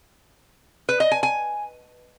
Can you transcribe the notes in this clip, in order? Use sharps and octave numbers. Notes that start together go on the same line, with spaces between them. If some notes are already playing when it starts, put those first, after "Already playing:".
B4
D#5
G#5
G#5